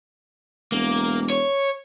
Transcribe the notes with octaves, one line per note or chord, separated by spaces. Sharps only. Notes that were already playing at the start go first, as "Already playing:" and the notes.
E1 A#3
C#5